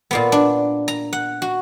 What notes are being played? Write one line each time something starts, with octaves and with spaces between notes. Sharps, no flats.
A#2 A#3 B3
D4
A#5
F#5
F#4